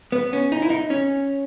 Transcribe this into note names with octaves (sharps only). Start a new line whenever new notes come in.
B3
C#4
D#4
E4
D#4
C#4